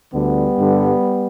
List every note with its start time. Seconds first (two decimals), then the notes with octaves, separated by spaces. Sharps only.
0.12 D2 D3 G3 B3
0.57 G2 D3